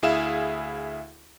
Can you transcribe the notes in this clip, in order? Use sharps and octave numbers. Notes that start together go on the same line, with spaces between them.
D2 E4 G#4 E5 F5 E7